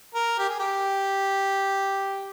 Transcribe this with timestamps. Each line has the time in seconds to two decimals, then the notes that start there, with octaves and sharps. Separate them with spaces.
0.15 A#4
0.39 G4
0.49 G#4
0.59 G4